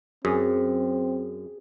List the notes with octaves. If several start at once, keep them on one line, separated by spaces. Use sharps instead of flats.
F#2 C4 G#4